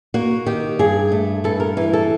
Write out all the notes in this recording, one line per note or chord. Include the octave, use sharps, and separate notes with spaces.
A#3 F#4
D#3 G4
G2 G#4
A3
G2 A4
A#4
E3
A4